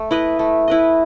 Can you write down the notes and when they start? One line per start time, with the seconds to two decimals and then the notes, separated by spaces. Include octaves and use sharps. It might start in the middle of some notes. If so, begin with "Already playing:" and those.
Already playing: A3
0.11 E4 B4 D#5
0.39 A3
0.68 E4 B4 D#5